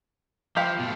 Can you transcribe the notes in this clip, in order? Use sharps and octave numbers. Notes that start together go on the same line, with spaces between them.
F3 G4 F5 B5
B2 A3